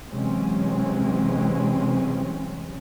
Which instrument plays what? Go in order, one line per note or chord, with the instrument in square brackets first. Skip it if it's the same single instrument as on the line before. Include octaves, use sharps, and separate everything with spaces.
[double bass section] C3 E3 F#3 G#3 C4 C#4